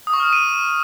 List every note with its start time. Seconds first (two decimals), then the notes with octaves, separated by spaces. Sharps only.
0.07 D#6
0.13 C#6
0.20 F6
0.26 D#6
0.33 D#7